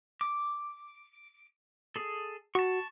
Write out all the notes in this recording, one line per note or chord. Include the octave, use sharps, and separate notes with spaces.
D6
G#4 A4
F#4 A5 C#6